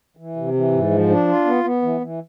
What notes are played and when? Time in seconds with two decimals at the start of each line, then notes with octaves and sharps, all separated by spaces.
0.17 E3
0.36 C3
0.54 E3
0.72 G#2
0.91 F3
1.09 D4
1.28 F4
1.45 B3
1.64 B3
1.82 E3
2.01 E3